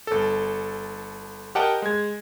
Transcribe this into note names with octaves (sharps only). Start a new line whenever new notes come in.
G1 A4
G4 A#4 D#5 F#5 G5 A5
G#3 G#6